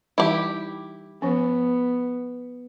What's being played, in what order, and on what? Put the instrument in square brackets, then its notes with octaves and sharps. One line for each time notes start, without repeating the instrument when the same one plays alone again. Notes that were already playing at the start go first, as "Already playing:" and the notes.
[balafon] E3 G3 D#4 [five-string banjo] E4 G4
[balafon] F3 C#4 [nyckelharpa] B3